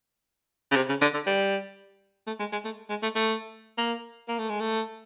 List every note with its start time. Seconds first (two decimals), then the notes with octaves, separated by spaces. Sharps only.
0.71 C#3
0.76 C3
0.89 C#3
1.01 D3
1.14 D3
1.26 G3
2.27 A3
2.40 G#3
2.53 G#3
2.65 A3
2.90 G#3
3.03 A3
3.15 A3
3.78 A#3
4.28 A#3
4.39 A3
4.50 G#3
4.60 A3